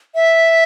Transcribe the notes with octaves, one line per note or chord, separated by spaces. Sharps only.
E5